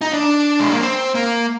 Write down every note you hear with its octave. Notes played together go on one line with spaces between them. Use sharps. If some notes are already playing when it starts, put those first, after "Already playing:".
D#4
D4
G#3
A#3
C4
A#3